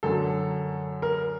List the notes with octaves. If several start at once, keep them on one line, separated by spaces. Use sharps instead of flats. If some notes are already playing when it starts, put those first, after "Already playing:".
F#2 D3 F#3 A4
A#4